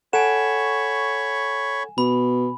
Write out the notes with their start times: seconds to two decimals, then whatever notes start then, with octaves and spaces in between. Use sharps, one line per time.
0.13 A4 C#5 F#5 G#5 B5 C#6 E7
1.98 B2 B5